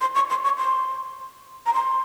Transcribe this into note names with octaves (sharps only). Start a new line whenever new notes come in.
C6
C#6
C6
C#6
C6
A#5
C6